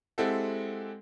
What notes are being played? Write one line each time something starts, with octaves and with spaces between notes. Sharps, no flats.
G#3 C4 E4 G4 A4 F#5